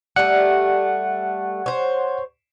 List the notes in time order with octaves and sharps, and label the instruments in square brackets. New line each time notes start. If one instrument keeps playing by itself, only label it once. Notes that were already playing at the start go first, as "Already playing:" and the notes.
[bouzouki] G3 A3 [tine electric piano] F#5
[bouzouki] C5 C#5